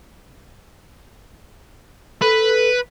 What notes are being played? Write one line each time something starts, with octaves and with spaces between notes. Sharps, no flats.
A4 B4